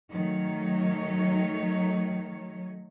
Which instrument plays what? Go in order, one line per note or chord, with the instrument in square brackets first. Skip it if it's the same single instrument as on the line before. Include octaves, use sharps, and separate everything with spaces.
[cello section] D#3 F#3 A3 C#5